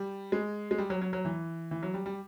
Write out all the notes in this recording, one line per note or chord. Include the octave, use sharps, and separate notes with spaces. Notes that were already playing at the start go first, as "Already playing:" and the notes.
Already playing: G3
G#3
G#3
G3
F#3
F#3
F#3
E3
E3
F#3
G3
G3